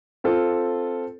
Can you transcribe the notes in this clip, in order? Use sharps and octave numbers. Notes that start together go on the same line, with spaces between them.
C4 F4 A4